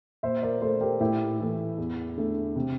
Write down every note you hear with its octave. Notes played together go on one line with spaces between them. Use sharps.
A#2 C5 E5
A#4 D5
A3 A4 C5
G4 A#4
A2 E4 G4
E3 A3
E2
D3 A3
C3